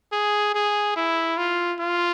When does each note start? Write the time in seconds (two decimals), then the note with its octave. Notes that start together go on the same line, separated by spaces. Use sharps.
0.13 G#4
0.55 G#4
0.96 E4
1.37 F4
1.80 F4